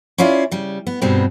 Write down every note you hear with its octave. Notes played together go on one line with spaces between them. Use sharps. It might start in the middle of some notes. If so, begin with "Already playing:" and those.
C#4 E4 F4 D5 F5
C#3 G3
B3
G2 B2 G3 G#3 C4 D#4